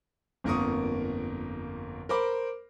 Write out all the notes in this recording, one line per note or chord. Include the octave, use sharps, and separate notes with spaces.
G1 F2 A#3 A#4 C#6 D#6
A#4 C5 B5 D6